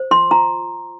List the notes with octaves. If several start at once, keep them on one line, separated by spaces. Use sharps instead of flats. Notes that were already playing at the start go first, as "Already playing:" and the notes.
Already playing: C5
F4 C6
F4 A#5